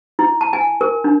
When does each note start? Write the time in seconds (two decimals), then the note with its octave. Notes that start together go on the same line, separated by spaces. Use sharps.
0.19 E4
0.41 A5
0.53 G#5
0.81 A#4
1.04 D4